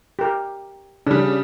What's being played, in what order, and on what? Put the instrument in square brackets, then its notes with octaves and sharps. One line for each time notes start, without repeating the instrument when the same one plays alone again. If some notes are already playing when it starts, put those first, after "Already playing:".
[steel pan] G4 A#4
[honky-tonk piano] C#3 G3 [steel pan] D4